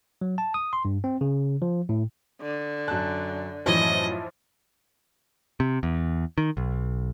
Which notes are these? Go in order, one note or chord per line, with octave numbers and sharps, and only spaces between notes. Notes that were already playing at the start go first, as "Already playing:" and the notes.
F#3
A5
D#6
C6
G2
C4
C#3
F3
A2
D3
F#2 A5 F#6
F#2 A2 E3 F3 C#5 D#5
C3
E2
D#3
B1